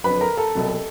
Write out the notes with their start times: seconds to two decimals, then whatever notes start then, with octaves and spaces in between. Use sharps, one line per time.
0.04 F2 D3 F#3 B4 B5
0.21 A#4 A#5
0.37 A4 A5
0.55 C2 B2 F#3